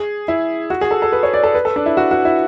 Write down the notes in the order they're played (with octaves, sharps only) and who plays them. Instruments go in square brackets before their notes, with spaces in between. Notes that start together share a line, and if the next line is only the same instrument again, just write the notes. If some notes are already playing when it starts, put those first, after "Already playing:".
Already playing: [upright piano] G#4
E4
F#4
G#4
A4
A4
B4
C#5
D5
A4
B4
A4
D4
E4
F#4
F#4
E4